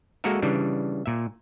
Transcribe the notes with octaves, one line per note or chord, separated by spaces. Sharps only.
G#3 A#3 F#4 A4 A#4 E5
C#3 E3 G3 D4
A#2 E5